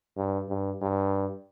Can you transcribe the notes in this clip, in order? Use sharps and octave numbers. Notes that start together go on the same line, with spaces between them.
G2
G2
G2